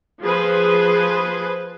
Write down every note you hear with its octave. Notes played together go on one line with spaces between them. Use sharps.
F3 G#4 B4 C5